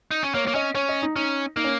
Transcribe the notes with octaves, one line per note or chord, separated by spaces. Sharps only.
D#4
C#4
A#3 C#5
A#3 C#5
C#4 D#5
C#4 C#5
D#5
D#4
C#4 D#4
A#3 D#4
C#4